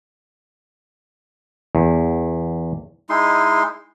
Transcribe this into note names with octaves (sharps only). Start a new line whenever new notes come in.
E2
G#3 D#4 E4 C6